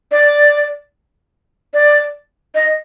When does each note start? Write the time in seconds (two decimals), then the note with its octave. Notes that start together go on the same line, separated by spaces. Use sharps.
0.11 D5
1.74 D5
2.55 D#5